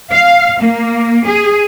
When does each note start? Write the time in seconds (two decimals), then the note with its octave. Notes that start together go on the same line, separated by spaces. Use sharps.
0.13 F5
0.61 A#3
1.26 G#4